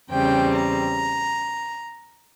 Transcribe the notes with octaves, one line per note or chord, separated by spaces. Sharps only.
E2 C#3 G3 C4 G5
A#5